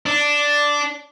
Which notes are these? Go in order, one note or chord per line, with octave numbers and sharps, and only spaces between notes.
D4